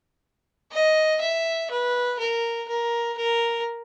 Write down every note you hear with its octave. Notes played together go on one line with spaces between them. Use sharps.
D#5
E5
B4
A#4
A#4
A#4